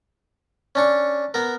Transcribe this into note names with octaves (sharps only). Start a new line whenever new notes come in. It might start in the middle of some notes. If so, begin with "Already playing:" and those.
C#4 D4 C#6
B3 A#4